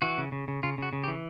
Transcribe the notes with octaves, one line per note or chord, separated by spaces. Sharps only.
E3 F#4
C#3
C#3
C#3
C#3 F4
C#3 F#4
C#3
G4
E3